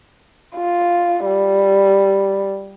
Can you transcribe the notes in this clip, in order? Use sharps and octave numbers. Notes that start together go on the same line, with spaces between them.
F4
G3